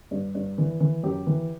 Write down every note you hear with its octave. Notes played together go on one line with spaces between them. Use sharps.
G2
G2
E3
E3
F#2 G4
E3